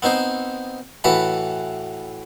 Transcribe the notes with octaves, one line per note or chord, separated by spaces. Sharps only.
B3 C4 D#4 C5
A2 E3 F#4 B4 B5